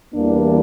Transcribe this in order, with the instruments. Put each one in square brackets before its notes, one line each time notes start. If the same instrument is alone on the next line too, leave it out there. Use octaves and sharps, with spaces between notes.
[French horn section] E2 E3 G3 A#3 D4